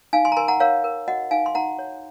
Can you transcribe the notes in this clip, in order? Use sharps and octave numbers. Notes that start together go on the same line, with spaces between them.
D#4 F5 G#5
G#5 C6
A#5
A#4 G#5 C6
F#5 A#5
A#4 C#5 F5
A#4
F#4 D#5 F#5
D#4 F5 G#5
C6
D#4 F#5 A#5
C#5